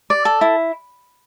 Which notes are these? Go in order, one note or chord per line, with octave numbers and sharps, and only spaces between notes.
D5
A4
E4